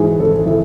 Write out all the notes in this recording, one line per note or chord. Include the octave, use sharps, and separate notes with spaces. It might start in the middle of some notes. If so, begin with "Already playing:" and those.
Already playing: G#2 E3 F#4 G#4
G#1 A4
E3 A4